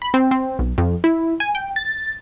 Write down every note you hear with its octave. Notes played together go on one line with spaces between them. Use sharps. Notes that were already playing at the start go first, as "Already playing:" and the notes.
B5
C4
C4
B1
F2
E4
G#5
G5
A6